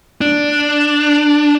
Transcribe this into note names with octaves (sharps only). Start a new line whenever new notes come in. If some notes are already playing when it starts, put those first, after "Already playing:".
D4